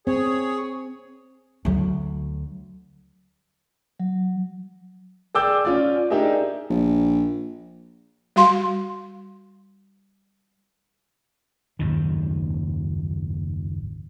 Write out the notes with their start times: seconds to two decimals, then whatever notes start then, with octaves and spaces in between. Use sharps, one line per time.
0.07 C4 G#4 C#5
1.65 D2 F#3
4.00 F#3
5.34 G#4 D5 G5 D6 E6 G6
5.65 C#4 F4 D5
6.10 D4 D#4 G4 G#4 A#4 E5
6.70 A#1
8.36 G3 F#4 F5 C6
11.79 F#1 D#2 G#2 D#3